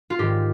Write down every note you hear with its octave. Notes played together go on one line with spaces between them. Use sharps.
F4
G#2 D#3 G#3 G4